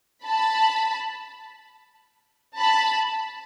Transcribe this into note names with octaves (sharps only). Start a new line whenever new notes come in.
A5 B5
A5 B5